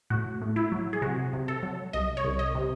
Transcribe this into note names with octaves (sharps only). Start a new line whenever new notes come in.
A2 F#4
A2
E4
F#3
G#4
C3 F#4
C3
A4
F#3
C2 D#5
C#5
C2
D#5
C3